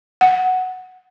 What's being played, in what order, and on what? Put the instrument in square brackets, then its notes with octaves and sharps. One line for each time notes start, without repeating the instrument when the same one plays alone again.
[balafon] F#5